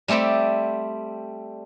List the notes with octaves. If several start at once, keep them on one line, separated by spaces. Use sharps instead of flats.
G3 A3 C4 A4 D5